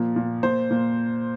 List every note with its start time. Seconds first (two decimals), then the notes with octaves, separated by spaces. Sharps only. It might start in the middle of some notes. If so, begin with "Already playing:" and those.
Already playing: A#2 F3
0.16 A#2
0.43 A#2 C5
0.71 A#2